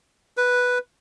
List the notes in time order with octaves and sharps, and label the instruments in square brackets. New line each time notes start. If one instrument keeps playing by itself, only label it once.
[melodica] B4